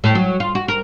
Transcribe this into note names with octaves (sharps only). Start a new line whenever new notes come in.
A2
F#3
F4
F#4
A#4